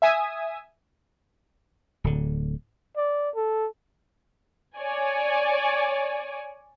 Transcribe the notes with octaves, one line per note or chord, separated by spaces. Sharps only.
E5 G#5 D#6
D1 D3
D5
A4
C#5 D5 G#5